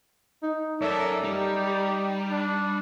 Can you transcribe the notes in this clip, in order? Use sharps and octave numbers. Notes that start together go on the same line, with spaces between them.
D#4
F#2 A4 A#4 D5 E5
G3 D#4 G4
D4